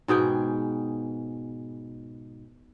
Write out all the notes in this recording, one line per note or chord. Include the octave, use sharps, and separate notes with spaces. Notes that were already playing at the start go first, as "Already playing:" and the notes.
G#2 B2 G#4 G5